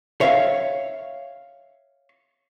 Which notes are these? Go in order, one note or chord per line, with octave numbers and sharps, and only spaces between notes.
C#5 E5 F5